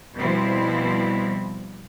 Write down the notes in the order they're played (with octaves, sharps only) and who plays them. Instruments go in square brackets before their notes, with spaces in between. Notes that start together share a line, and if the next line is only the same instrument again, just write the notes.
[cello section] B2 F3 G3 C4 E4